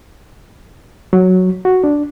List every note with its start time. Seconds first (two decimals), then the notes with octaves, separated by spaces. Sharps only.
1.13 F#3
1.65 F#4
1.84 D4